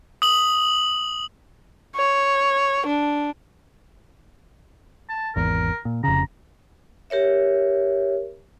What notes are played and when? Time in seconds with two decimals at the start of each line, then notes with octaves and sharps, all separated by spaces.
0.22 D#6 F#7
1.96 C#5
2.86 D4
5.09 A5
5.36 G#1 E2 A#4
5.85 A#2
6.04 F1 C#3 A#5
7.10 G4 A#4 C#5 E5